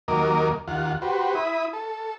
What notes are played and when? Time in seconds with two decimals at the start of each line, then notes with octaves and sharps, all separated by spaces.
0.08 D#2 F#3 A#3 A#4 D#5 D6
0.68 D#2 F4 F#5
1.02 F#4 G4 B4 C5
1.35 E4 B5 D#6
1.73 A4